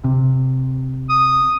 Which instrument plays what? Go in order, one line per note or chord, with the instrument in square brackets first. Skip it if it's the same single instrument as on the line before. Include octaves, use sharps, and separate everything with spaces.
[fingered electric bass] C3
[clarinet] D#6